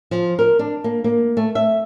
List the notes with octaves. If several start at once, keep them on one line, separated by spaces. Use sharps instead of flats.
F3
A#4
D4
A#3
A#3
A3
E5